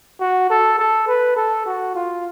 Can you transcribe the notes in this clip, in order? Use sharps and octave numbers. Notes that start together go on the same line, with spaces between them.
F#4
A4
A4
B4
A4
F#4
F4